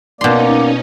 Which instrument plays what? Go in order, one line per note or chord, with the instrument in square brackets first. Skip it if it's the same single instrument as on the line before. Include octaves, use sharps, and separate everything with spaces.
[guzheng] B2 C6 [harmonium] A#3 D5 [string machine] C#4 D#4